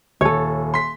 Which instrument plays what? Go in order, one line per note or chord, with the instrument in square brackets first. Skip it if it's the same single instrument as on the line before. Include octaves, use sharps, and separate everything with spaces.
[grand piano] D#1 [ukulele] A4 C#5
[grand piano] C6 B6